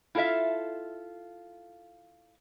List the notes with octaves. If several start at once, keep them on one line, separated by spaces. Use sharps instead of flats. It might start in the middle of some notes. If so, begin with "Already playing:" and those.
E4 F4 A4 C#5 E5 F5